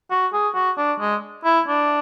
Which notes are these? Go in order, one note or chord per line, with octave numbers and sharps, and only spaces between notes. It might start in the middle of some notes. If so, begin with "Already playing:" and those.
F#4
G#4
F#4
D4
G#3
E4
D4